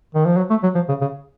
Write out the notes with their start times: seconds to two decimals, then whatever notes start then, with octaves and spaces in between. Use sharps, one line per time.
0.15 D#3
0.25 F3
0.37 F#3
0.50 A3
0.63 F#3
0.75 F3
0.89 C#3
1.01 C#3